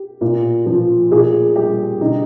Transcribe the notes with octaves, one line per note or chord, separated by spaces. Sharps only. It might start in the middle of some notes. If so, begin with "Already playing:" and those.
Already playing: G4
A#2
F3
A#2 G#4
G3 G4
D3 D#4